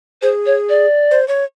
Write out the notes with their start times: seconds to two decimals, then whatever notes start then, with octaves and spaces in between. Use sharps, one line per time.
0.22 G#4 C5
0.46 C#5
0.69 D5
1.11 C5
1.28 C#5